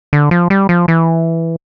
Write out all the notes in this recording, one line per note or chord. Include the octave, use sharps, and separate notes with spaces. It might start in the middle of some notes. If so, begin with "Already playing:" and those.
D3
F3
G3
F3
E3